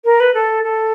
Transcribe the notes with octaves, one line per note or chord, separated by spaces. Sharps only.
A#4
B4
A4
A4